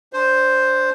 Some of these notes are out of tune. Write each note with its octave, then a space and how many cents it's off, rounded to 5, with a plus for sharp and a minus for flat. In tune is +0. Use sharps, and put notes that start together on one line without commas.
D4 -20 C5 +0